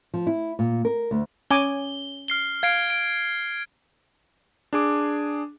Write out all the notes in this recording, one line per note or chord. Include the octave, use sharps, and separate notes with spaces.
F3
E4
A#2
A#4
D2
C#4 G#5 D6 G7
F6 C7 G7
F5 G#6 C7 D7
D7
D4 G#4 D6